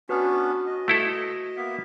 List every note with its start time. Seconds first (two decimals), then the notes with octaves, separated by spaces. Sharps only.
0.09 B3 C#4 D4 F#4 B4 F6
0.67 D#5
0.88 A3 E4 A4
1.57 A#3 B3 E5